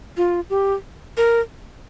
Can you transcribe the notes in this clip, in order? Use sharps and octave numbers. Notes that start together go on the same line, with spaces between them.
F4
G4
A#4